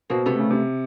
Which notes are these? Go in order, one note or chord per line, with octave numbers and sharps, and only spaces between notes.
B2 A#3 C4
C3 A3 B3
C#3
C3